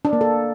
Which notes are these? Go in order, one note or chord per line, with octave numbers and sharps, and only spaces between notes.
D4
A#3
A4